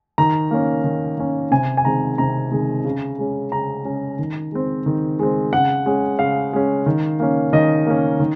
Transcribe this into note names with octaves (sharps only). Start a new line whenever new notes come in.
D#3 A#5
A#3 C#4
D#3
A#3 C#4
C3 G#5
G#5
D#3 G#3 C4 A#5
C3 A#5
D#3 G#3 C4
C#3
G#3 C#4
C#3 A#5
G#3 C#4
D#3
G#3 C4
D#3
G#3 C4
C#3 F#5
G#3 C#4
C#3 F5
G#3 C#4
D#3
A#3 C#4
D#3 D#5
A#3 C#4
D#3